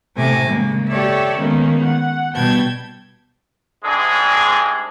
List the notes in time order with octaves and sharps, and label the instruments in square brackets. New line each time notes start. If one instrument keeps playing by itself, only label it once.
[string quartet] A2 C3 A3 G#5 D6 A#6
C#3 G#3 A#3
G4 A4 C#5 D5 E5
D#3 G#3 A#3 B3 C#4 D#4
F#5
B2 G3 G5 A5 G#6
[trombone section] C2 G#2 G#3 D4 G#4